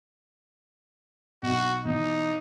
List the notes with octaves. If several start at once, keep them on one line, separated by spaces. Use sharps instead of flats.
B1 F#4
B2 E3 D#4